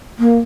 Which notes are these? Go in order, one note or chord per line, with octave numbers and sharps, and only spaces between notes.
A#3